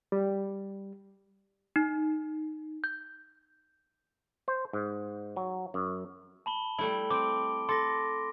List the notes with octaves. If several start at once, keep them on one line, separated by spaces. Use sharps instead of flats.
G3
D#4
G6
C5
G#2
F#3
F#2
A5 B5 G7
G3 A3 E4 B5
C4 D6 D7
A4 C6 D6 A#6